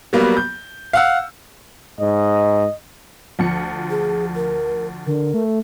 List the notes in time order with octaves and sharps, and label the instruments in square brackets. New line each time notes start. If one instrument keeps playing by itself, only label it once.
[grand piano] F#3 G3 A#3 B3
G6
F5 F#5 E6
[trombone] G#2 [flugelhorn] D#5
[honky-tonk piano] D2 F3 C#7
[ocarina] G#4
A#4
[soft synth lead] D3 [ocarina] A#4
[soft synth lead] A3